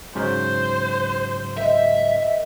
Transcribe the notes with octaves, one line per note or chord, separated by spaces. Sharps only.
G#2 C#3 F#3 C5
A#4 D#5 E5